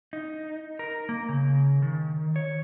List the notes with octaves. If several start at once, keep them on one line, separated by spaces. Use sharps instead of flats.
D#4
A#4
A#3
C#3
D#3
C#5